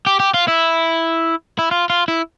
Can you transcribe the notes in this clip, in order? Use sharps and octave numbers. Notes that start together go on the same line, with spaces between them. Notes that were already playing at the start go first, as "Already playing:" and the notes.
G4
G4
F4
E4
E4
F4
F4
E4